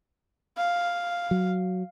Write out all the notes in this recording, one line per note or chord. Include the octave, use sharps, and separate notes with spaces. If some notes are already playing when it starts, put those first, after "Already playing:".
F5
F#3